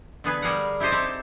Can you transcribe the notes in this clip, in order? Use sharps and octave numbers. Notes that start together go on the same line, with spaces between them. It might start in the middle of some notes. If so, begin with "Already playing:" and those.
D3 B3 G#4 B4
G3 G#4 A#4 F#5
E4 G4 A4 C5 D#5
C4 D#4 E4 G4 A5